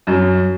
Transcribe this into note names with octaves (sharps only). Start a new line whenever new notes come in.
F#2